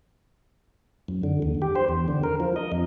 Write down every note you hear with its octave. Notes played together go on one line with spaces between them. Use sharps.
F#2
D3
D#2
G4
C5
E2
D3
A#4
F3
D#5
F2